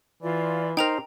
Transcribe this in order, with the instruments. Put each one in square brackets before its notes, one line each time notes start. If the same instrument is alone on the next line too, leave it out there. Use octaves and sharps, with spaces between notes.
[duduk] E3 [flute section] F4 D5
[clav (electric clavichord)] D#4 A#4 [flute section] C5 [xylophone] G5 A#5 F7